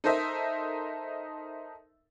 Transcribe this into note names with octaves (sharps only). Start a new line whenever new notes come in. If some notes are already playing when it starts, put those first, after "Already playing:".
D#4 A4 A#4 C5 D#5 E5